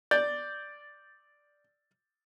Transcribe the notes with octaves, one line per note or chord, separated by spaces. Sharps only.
D5 G6 A6